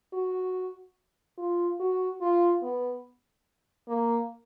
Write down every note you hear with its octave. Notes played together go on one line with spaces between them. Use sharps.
F#4
F4
F#4
F4
B3
A#3